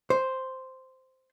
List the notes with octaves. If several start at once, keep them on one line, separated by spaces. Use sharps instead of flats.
C5